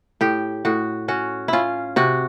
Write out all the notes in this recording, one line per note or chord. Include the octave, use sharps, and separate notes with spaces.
A2 G4
A2 F#4
C#4 F#4
C#4 E4 F4
C3 F#4